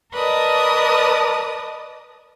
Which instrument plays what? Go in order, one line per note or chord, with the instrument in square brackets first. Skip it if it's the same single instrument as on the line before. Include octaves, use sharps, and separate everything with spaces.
[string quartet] A#4 B4 D5 D#5 A5 D#6